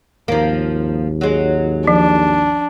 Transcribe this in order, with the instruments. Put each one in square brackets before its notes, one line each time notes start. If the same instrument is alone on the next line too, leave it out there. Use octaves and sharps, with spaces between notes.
[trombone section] G#1 D#2 [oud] F3 A#3
[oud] F#3 G#3
[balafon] F3 [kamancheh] D4